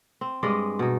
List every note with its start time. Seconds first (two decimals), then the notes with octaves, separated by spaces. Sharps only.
0.21 C4
0.43 G2 G#3 D5 D#5
0.79 B2 D#4